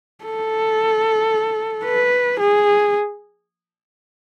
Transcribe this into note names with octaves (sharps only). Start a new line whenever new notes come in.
A4
B4
G#4